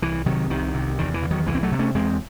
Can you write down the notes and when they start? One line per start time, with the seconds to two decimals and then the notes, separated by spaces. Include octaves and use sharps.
0.02 C2 E3
0.26 C3 D#3 F#3
0.50 C2 D#3
0.74 C3
0.98 E2 D#3
1.14 E3
1.22 C#3
1.31 D#3 F#3
1.46 C2 E3 G#3
1.55 C4
1.63 F#3 A3
1.72 C3
1.79 A3 C#4
1.95 E2 G#3 C4